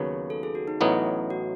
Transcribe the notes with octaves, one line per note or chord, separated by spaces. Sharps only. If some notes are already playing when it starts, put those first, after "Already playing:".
Already playing: D#2 C#3 F#3 B3
A4
G#4
F#4
D#4
A1 A2 F#3 B3 D#4 E4
F#4